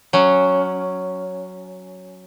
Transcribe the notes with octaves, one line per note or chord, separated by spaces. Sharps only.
F#3 C#4